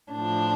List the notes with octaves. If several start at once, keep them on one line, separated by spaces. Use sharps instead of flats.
A2 F3 D4